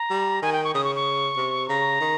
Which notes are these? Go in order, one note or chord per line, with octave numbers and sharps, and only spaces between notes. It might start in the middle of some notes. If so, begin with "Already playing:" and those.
Already playing: A#5
G3
D#3 G#5
G5
C#6
C#3 D#6
C#6
C#6
C3
C#3 A#5
D#3